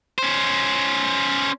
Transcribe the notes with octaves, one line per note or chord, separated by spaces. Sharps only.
C#4 C5